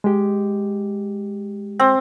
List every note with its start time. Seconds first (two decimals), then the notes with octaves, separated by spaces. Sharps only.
0.04 G#3 G4
1.79 C4